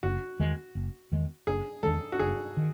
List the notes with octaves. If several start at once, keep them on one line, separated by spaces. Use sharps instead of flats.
F#1 F#4
E2 D#3 G#3
F#1
E2 D#3 G#3
F#1 G#4
E2 D#3 G#3 A4
F#4
F#1 G#4
D#3